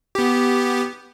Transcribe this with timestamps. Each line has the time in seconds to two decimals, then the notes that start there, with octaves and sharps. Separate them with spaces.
0.15 B3 G4